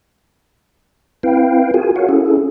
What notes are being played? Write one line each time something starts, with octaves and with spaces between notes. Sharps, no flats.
C4 E4 B4 F5 G5
F4 F#4 G#4 A#4 G#5
F#4 A#4 C#5 F5 F#5
C#4 E4 G#4 A4